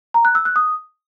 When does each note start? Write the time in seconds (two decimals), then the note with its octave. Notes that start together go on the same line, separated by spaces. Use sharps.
0.14 A#5
0.25 F#6
0.35 E6
0.45 F#6
0.56 D#6